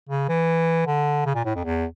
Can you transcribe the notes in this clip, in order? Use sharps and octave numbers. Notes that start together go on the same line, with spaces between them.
C#3
E3
D3
C#3
A#2
A2
F2
E2